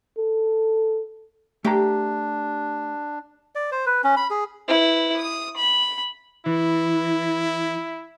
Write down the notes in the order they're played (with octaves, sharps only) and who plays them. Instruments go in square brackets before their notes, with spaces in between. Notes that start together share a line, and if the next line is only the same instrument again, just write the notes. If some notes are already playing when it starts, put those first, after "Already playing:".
[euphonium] A4
[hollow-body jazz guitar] A3 A#5 [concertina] D4 [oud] G4
[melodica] D5
C5
B4
C#4
B5
G#4
[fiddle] E4 B4
D#6
B5
[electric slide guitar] E3 [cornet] E4